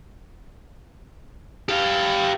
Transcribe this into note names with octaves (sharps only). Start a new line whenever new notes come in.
G4 F5